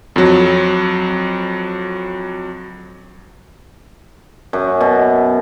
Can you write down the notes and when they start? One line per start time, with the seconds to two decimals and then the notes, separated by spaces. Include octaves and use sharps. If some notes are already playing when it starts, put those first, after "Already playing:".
0.16 F2 F#3
4.53 F#2
4.81 B2